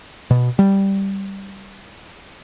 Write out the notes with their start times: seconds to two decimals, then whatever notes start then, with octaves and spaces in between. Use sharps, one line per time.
0.31 B2
0.59 G3